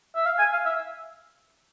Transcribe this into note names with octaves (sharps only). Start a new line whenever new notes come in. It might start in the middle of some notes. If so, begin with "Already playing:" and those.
E5
F5
G#5
F5
E5